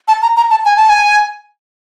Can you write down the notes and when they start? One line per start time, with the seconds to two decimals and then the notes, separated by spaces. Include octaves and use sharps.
0.08 A5
0.22 A#5
0.36 A#5
0.50 A5
0.65 G#5
0.76 A5
0.89 G#5